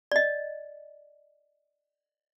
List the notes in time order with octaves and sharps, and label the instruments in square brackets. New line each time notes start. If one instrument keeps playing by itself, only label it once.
[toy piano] D5 D#5